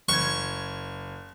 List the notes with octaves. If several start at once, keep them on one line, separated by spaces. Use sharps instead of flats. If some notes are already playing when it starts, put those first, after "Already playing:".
F#1 C#6 G#6